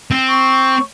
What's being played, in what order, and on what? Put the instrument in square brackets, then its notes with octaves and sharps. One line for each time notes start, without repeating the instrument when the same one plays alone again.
[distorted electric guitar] C4
[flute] C#6